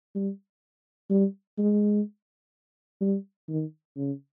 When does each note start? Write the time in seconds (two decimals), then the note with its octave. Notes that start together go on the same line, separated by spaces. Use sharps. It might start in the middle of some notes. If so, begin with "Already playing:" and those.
0.15 G3
1.10 G3
1.58 G#3
3.01 G3
3.49 D#3
3.97 C#3